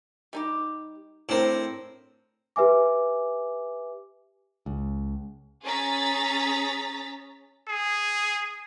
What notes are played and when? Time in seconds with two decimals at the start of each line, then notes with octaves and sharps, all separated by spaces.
0.33 G3 D#4 G4
1.29 A2 C4 D4 A#4
2.56 G4 B4 E5 G#5 D6
4.66 C#2
5.64 C#4 G#4 A#5 A6 B6
7.69 G#4